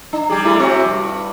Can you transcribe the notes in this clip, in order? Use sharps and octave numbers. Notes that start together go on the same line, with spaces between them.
D4
G3 G4 G#4
G3 A3 E4
C3 C4 F#4
G2